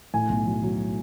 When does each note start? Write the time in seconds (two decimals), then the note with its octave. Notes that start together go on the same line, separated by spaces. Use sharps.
0.14 A2 G#5
0.29 B1
0.47 F#3
0.63 F#3